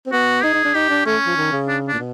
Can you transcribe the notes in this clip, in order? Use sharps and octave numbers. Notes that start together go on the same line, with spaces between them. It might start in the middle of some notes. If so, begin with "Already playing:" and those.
C4
B3 F#4
D#4 G#4
D#4
D4
D#4 G4
D4
A3 C#4
F3
D#3
C#3
D4
D4
A#2
B2